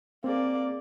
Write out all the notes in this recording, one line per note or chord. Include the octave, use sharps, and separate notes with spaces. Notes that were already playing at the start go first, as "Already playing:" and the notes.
A#3 C4 G#4 D5